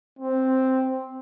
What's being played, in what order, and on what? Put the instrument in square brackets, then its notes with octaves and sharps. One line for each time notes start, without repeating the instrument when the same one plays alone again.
[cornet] C4